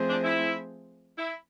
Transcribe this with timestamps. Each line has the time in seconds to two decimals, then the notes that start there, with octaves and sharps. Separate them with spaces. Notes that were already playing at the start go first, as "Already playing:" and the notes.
Already playing: F3 A3 C4 G#4 C5
0.08 D4
0.24 E4
1.17 E4